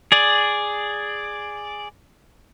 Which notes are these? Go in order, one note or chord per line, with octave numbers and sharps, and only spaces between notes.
G#4 D5